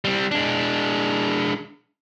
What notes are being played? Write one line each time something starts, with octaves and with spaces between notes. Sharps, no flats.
G3 C4
G#3 D4